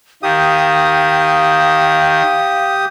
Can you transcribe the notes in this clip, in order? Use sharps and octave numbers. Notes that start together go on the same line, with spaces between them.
D#3 G4 F5 D#6